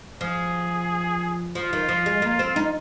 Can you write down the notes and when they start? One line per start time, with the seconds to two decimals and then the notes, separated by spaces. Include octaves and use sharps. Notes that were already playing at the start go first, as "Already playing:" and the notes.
0.21 F3 G#4
1.55 F3 F4
1.73 D#3
1.89 F3
2.06 G#3
2.22 A#3
2.39 C4
2.56 D#4